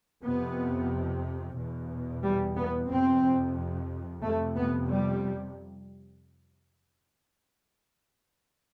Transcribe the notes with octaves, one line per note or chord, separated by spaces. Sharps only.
F2 C3 B3
E2 B2
G3
B3
F2 C3 C4
F2 C3 A3
B3
G3